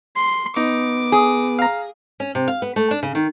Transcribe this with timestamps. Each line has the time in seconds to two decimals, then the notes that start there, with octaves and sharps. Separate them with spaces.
0.16 C6
0.56 B3 D#4 D6
1.12 G#4
1.59 F5 A#5
2.20 C#4
2.35 C3
2.48 F5
2.62 B3
2.76 A3
2.91 D4
3.03 C#3
3.15 D#3